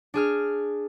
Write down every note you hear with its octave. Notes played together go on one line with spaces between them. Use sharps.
D4 G#4 F6